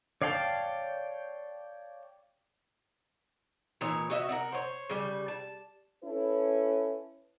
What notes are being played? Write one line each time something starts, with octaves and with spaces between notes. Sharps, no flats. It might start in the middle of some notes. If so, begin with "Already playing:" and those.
C#5 D5 F5 G5 A5
A#2 E3 D#4 C#5
F#4 D#5 E5
A#4 D#5 F#5
C5 C#5
C#3 G3
A5
C#4 E4 A4 B4